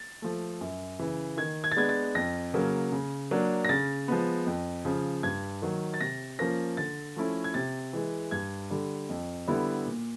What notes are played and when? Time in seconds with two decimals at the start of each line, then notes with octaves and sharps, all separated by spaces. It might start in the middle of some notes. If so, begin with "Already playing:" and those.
Already playing: A6
0.22 F3 A3
0.61 F#2
0.99 C#3 E3
1.37 D#3 G#6
1.64 G#6
1.72 A6
1.76 G#3 B3 D4 G#6
1.89 A6
2.15 F2 A#6
2.54 C#3 F#3 A#3
2.92 C#3
3.31 F#3 A#3 D4
3.65 A#6
3.69 C#3 A6
4.08 F3 G#3 B3
4.47 F2
4.85 C#3 F3
5.23 G2 G#6
5.62 D#3 F#3
5.94 A6
6.01 C3 A#6
6.39 F3 A#3 C#4 A#6
6.77 D3 A6
7.16 F3 A3 C#4 E4
7.44 G#6
7.54 C3 A6
7.93 E3 G#3
8.31 G2 G#6
8.71 D3 G3
9.09 F2
9.48 D3 G3 B3 E4
9.86 A#2